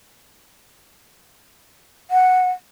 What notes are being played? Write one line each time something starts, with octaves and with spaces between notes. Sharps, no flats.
F#5